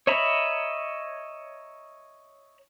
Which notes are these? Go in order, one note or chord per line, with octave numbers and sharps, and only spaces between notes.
C#5 D#5 E5 A#5 B5